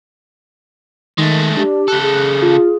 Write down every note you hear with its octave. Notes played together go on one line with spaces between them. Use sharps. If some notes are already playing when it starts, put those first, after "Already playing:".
D#3 G#3 A3
D4 G4
C#3 A4 F#6
G#4
F4